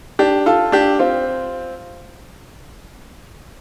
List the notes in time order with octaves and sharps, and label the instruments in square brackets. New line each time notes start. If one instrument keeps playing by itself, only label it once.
[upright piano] D4 G4
F4 A4
D4 G4
C4 F4